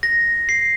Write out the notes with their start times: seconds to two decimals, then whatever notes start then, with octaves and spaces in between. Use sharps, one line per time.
0.03 A#6
0.49 C7